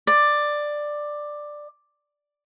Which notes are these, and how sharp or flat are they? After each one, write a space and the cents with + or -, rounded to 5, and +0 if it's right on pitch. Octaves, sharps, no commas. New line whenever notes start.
D5 +10